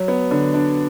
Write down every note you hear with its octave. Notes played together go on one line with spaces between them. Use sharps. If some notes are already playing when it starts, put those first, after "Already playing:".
Already playing: F#3
B3
D3
D4